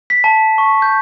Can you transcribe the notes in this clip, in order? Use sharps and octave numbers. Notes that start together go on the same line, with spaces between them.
B6
A5
C#6
G6